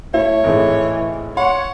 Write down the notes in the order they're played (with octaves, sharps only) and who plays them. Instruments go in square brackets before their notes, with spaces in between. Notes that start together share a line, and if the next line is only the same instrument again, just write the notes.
[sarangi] A3 [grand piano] E4 [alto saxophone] C#5
[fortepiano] G#1 A2 G#4 [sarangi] E3
[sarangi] C#5 [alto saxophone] F#5 [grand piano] C6